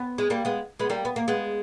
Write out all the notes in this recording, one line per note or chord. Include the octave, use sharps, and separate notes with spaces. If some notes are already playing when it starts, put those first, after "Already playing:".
Already playing: B3
G#3
G3 A#3
G#3 B3
G#3 B3
G3 A#3
B3
A#3
G#3 B3